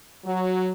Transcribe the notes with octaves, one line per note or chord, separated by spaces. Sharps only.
F#3